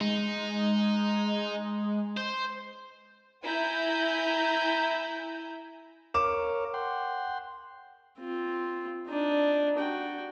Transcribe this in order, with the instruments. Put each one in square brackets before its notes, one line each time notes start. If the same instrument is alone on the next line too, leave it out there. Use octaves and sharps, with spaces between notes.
[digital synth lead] G#3 [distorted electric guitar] D#4
[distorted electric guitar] C5 [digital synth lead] G6
[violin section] E4 G#5 A#5 G6
[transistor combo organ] A#4 C#5 F5 [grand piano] D6 E7
[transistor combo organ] F#5 G5 C6
[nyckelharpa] C4 F4
D4 D#4
F#4 G5